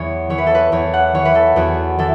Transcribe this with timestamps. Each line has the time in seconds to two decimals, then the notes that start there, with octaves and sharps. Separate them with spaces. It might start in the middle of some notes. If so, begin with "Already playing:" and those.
Already playing: E2 E3 C#5
0.30 E3 C#5
0.38 B4
0.47 A4
0.55 B4
0.72 E2 C#5
0.94 F#5
1.14 E3 C#5
1.25 B4
1.35 A4
1.56 E2 F#4
1.99 E3 A4